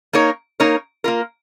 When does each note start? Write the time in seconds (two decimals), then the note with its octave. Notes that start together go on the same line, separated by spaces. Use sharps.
0.13 A#3 D#4 A#4 C#5
0.60 A#3 D#4 A#4 C#5
1.04 A#3 F4 A#4